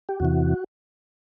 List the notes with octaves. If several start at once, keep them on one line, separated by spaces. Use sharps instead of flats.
G4
E2 C3 E3 F#4